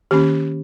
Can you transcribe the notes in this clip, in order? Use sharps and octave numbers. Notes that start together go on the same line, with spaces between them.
D#3 A#3 C#4 G4